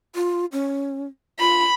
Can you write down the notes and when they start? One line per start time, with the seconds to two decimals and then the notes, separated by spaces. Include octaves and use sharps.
0.15 F4
0.52 C#4
1.40 F4 B5